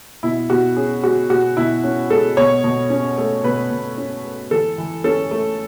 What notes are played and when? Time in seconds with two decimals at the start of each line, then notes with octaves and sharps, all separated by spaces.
0.23 B2 E4
0.50 B2 F#4
0.76 C#4 G#4
1.03 G#3 F#4
1.30 B2 F#4
1.57 B2 E4
1.84 C#4
2.10 G#3 A4
2.37 B2 C#5
2.64 B2
2.90 C#4
3.17 A3
3.44 B2 B4
3.71 B2
3.98 C#4
4.24 A3
4.51 E3 A4
4.78 E3
5.04 C#4 A4
5.31 A3